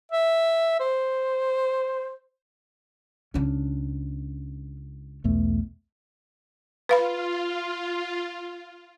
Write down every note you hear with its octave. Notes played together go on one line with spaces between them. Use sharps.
E5
C5
C#2 C#4 D4
B1 E2 A3
F4 B4 F5 B5